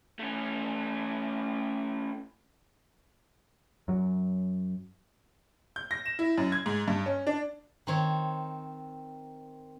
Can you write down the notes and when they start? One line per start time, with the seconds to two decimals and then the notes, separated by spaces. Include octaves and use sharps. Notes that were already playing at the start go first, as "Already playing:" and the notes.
0.20 A3 C#4
3.88 F#2 F#3
5.76 G6
5.91 A#6
6.06 E7
6.19 E4
6.38 F#2
6.52 G#6
6.66 G#2
6.88 G2
7.06 C#4
7.27 D4
7.87 D#3 C4 C#5